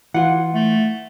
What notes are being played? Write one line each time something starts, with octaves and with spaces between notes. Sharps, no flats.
E3 F4 F#5
A3